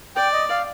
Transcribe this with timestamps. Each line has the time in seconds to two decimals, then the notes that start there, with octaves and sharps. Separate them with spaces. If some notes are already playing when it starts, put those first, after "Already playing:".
0.16 D5 G5
0.33 D#5
0.50 F5